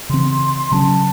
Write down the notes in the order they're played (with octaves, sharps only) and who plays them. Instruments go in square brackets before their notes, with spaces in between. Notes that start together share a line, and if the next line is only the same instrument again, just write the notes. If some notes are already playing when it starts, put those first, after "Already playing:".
[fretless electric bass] C#3 E3 C4 [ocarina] C6
[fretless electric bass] C#3 F#3 C#4 [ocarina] A5